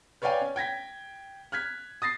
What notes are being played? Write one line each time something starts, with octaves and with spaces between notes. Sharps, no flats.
B4 C#5 D5 F5 G5 G#5
C#4
G5 G#6 A#6 B6
F6 F#6 G#6 B6
D#6 A6 A#6 C7